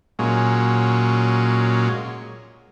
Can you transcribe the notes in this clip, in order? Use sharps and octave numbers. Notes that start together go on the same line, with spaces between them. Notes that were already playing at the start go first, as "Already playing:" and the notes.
A#2 F#3 G#3 C#4